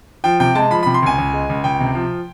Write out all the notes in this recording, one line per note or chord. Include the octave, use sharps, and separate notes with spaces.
F3 G5
C3 G5
G#3 A5
F3 B5
C3 B5
C6
C#2 G#5
C#2
G#3
C#2
C#2 G5
C3
F3